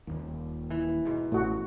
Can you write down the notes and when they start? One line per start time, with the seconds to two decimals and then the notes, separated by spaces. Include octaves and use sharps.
0.07 D#1 G#1 D#2
0.70 E3
1.05 G#2 B2
1.32 A1 A2 A3 F#4